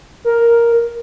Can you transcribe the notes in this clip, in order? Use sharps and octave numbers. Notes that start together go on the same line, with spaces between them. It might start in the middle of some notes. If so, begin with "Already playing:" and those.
A#4